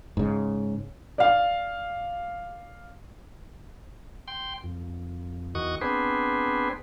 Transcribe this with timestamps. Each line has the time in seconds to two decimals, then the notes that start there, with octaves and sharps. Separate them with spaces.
0.17 G#2 C#3
1.18 D5 F5
4.28 G5 C6
4.64 F2
5.55 E2 D#3 F#4 C#6 D#6
5.81 B3 C4 D4 G#4 B4 C5